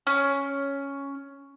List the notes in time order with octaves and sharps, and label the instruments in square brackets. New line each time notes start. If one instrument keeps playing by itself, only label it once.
[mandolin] C#4